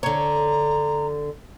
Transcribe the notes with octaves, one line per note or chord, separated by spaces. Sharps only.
D3 C#5 A#5